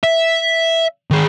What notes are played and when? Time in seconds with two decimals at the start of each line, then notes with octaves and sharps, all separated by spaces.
0.04 E5
1.11 D#3 G#4